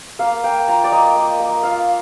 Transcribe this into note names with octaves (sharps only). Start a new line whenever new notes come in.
A#3 F5
A#3 G5
F4 A#5
D5
A#3 D#5
A#3
A#3
F4 F5